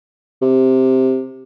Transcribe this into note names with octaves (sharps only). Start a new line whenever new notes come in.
C3